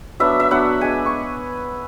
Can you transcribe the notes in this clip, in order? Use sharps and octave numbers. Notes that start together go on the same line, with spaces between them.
F#3 B3 D4 E5
E5
F#3 B3 D4 F#5
G#3 D4 G#5
C#6